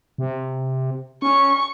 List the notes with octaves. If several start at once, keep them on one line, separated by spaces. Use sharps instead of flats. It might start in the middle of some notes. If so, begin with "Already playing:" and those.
C3
C#4 C#6